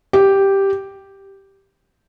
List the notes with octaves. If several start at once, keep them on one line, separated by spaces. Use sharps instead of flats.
G4